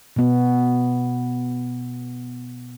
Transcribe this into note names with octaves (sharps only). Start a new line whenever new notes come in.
B2 B3